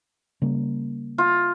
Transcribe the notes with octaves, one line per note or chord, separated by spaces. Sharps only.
C#3 G3 A#3
F4